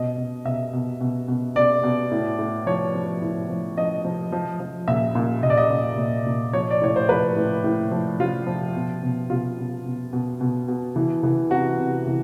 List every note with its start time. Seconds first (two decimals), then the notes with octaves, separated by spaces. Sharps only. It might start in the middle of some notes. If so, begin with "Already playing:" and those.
Already playing: B2 D#5
0.18 B2
0.45 B2 E5
0.73 B2
1.01 B2
1.28 B2
1.56 B2 D5
1.84 B2
2.11 A2
2.39 A2
2.66 F3 C#5
2.94 F3
3.22 A2
3.50 F3
3.77 F3 D#5
4.05 F3
4.32 F3
4.60 F3
4.88 A#2 E5
5.15 A#2
5.43 A#2 D#5
5.50 D5
5.57 D#5
5.70 A#2
5.98 A#2
6.26 A#2
6.53 F3 C#5
6.71 D5
6.81 A2 C#5
6.96 C5
7.09 F3 B4
7.36 A2
7.64 A2
7.91 F3
8.20 F3 F4
8.47 F3
8.75 B2
9.03 B2
9.30 B2 F4
9.58 B2
9.85 B2
10.13 B2
10.41 B2
10.68 B2
10.96 E3
11.23 E3
11.51 C3 F#4
11.79 C3
12.07 E3